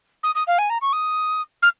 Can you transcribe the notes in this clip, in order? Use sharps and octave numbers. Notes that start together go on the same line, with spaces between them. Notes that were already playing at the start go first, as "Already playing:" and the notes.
D#6
D#6
F5
G#5
A#5
C#6
D#6
F6